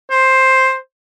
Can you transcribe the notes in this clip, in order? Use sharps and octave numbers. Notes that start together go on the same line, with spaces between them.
C5